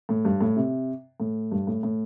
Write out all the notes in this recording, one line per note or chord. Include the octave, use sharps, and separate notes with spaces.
A2
G2
A2
C3
A2
G2
A2
A2